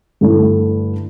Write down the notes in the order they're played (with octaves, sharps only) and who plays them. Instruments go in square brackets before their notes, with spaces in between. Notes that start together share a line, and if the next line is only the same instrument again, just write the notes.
[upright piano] G2 D3 A3 E4